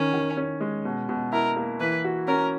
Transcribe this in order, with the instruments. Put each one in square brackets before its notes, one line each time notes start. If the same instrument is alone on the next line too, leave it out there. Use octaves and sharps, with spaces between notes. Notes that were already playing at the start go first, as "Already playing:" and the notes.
Already playing: [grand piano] D#3 [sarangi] C#4
[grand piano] D#3
C#4
G#3
B2
B2
[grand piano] E4 [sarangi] A#4
[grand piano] A#3
[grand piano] E3 [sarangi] B4
[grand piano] F#4
[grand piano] C#4 [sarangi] A#4